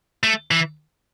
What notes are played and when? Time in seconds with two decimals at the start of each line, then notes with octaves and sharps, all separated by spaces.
0.23 A3
0.51 E3